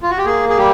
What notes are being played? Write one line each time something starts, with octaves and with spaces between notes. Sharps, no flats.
F4
F#4
G4
A#3 G#4
G#4
G3 G4